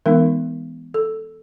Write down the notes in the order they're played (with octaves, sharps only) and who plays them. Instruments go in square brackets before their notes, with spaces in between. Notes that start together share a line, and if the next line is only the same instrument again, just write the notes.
[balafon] E3 G#3 B3 D#4 A#4
A4